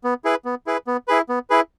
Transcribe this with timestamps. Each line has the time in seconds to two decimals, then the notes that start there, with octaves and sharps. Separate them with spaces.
0.04 B3
0.25 E4 G#4 B4
0.45 B3
0.67 E4 G#4 B4
0.87 B3
1.08 E4 G#4 B4
1.29 B3
1.50 E4 G#4 B4